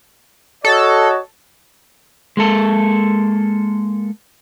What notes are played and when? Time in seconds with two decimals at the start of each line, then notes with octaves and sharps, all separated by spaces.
0.65 F#4 A4 C#5 D#5
2.37 G#3 A#3 A4